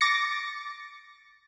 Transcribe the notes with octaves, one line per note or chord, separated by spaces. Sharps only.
D6 A6 A#6 C#7